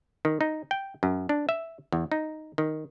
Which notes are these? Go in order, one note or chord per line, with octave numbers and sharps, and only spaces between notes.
D#3
D#4
G5
F#2
D4
E5
E2
D#4
D#3